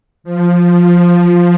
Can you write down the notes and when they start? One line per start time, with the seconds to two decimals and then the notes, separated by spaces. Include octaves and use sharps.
0.24 F3
0.64 F3